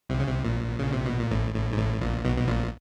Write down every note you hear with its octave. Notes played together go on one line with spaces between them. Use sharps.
C2 C3
C#3
C2 C3
A#1 A#2
C#3
C3
B2
A#2
A1 A2
A1 A2
G#2
A1 A2
A#1 A#2
B1 B2
B2
A#1 A#2